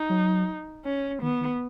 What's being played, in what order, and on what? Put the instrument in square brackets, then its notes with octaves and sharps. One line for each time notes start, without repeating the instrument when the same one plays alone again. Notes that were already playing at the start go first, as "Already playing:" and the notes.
Already playing: [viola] D#4
[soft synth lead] F#3
[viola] C#4
[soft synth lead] D#3 [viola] B3
[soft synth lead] D#3